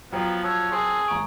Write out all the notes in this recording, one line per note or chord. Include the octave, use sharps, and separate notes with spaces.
F3 F#3 B3 F4 G5 A#5
C#5 A5 E6 F#6
C4 G#4
G#1 A#5 C#6 D7